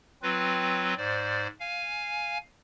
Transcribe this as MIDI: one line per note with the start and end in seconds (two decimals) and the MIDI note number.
0.22 0.94 54
0.22 0.94 60
0.22 0.94 65
0.22 0.94 71
0.97 1.47 44
0.97 1.47 72
0.97 1.47 74
1.60 2.38 77
1.60 2.38 80